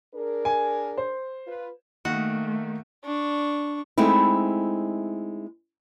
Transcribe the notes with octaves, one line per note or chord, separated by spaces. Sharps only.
D4 G#4 A#4
G#5
C5
F4 B4
D#3 A3 A#3 D#4 F#4
D4 C#6
G#3 A3 C4 D#4 E4